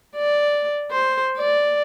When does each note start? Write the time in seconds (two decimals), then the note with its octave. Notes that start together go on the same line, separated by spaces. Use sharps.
0.16 D5
0.91 C5
1.38 D5